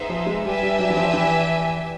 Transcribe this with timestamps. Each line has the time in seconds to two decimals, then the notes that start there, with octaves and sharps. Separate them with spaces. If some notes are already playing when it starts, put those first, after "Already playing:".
Already playing: B3 D#4 G#4 C5 E5
0.10 F3
0.26 G#3
0.44 G3 D4 G4 B4 E5 G#5
0.62 G3
0.79 F#3
0.90 E3
0.97 F3
1.13 E3